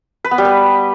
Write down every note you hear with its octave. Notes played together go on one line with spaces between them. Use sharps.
B4
B3
G3
B4